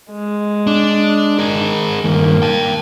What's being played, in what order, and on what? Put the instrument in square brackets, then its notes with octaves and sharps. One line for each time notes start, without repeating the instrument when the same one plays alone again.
[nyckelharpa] G#3
[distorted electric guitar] D4
G#4 A#4
[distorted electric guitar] G2 D#3 [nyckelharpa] A#3
[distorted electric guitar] G5 A5